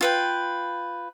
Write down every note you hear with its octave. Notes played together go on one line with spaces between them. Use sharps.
F4 B4 G5